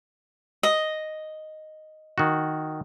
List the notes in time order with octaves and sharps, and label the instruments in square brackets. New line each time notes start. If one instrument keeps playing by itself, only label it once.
[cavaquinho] D#5
[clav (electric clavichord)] D#3 F#4